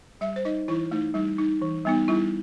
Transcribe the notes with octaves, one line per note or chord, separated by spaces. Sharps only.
G3 E5
C5
D#4 D#5
E3 E4
A3 D#4
G3 D#4
D#4
E3
G3 B3 D#4
G3 E4